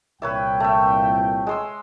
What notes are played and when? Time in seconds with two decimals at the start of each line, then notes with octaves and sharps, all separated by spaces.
0.22 C2 A#2 B4 C#5 E5 G5
0.60 A3 E5
1.47 G#3 C6 E6